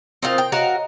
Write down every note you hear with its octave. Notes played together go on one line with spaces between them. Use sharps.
C4 D#4 F4 A#4 C5 D#6
G5
F#4 A#4 C#5 D#5 F5 A#5